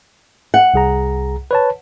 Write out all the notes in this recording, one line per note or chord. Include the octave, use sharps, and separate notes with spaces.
F#5
C2 G#4 A#5
B4 C#5 A5